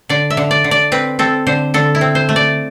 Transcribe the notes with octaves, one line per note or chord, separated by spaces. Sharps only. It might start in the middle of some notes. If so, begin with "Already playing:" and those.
D3 D5
E5
D3
D5
D3
D5
C4 B4
C4 A4
D3 C5
D3 A4
E4
C4
C5
A3
D5